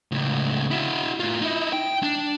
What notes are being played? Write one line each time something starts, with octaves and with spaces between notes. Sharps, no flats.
C#2 A2
E4 F#4
A2 F4
D#4 E4
G5
D4